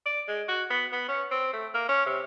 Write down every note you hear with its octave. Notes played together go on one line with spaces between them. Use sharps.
D5
G#3
F#4
B3
B3
C#4
C4
A3
A#3
C#4
C3